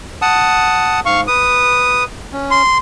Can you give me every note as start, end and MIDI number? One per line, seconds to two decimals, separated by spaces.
0.22 1.00 78
0.22 1.00 81
0.22 1.00 87
1.06 1.27 44
1.06 1.21 77
1.06 1.21 85
1.28 2.05 71
1.28 2.03 87
2.33 2.62 61
2.51 2.78 84